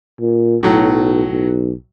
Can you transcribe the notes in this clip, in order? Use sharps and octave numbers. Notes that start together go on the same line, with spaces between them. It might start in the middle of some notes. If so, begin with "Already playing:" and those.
A#2
B1 A2 F#3
B1